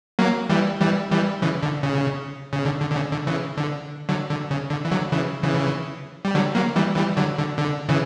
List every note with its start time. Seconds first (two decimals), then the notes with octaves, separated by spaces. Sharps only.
0.19 F#3 A#3
0.50 E3 G3
0.80 E3 G3
1.11 E3 G3
1.42 C#3 E3
1.63 D3
1.83 C#3
2.53 C#3
2.65 D3
2.81 D3
2.91 D3
2.96 C#3
3.12 D3
3.27 C#3 E3
3.57 D3
4.09 D3 F#3
4.30 D3
4.51 C#3
4.70 D3
4.85 E3
4.91 D3 F#3
5.11 C#3 E3
5.43 C#3 E3
6.25 G3
6.35 D3 F#3
6.55 F#3 A#3
6.76 E3 G3
6.96 E3 G3
7.17 D3 F#3
7.38 D3
7.58 D3
7.89 C#3 E3